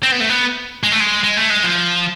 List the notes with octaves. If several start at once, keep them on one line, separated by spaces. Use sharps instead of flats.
C4
B3
A3
B3
G#3
A3
G#3
G#3
A3
G#3
F3